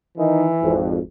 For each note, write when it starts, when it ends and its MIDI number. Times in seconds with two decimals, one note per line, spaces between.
0.18 0.48 51
0.18 0.75 52
0.18 0.48 63
0.63 0.98 32
0.63 0.98 41